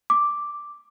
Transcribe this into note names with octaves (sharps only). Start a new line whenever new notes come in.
D6